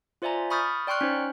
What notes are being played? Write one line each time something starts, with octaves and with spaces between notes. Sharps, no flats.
F4 C5 D5 E5 G#5 A#5
B5 C#6 D#6 F6 G6 A6
D5 G5 C6 C#6 F6 F#6
C#4 D#4 C5